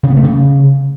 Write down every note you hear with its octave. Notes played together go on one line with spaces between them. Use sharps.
C#3
B3
A3
C#3